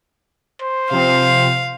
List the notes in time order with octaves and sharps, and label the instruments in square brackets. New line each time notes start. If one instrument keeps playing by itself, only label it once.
[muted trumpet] C5
[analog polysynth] C3 F3 C4 [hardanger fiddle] F5